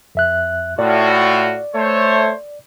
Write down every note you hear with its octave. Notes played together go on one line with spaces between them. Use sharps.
F2 E5 F#6
A2 F4 F#4 D5
A3 C5 C#5